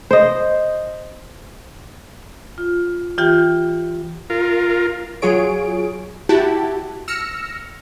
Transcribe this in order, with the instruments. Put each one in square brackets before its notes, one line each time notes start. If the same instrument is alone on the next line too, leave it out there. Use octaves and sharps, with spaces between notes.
[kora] C5 D#5
[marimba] F4
E3 F4 G4 G5 G6
[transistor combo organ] F4 A#4
[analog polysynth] F#3 F4 G#4 C#5 D7
E4 F#4 G4 A5
E6 F6 A#6 C#7